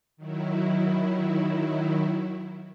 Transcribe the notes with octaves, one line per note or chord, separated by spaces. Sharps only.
D#3 F#3 E4